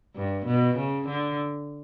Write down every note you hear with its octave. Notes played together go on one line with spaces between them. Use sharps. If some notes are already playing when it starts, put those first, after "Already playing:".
G2
B2
C#3
D3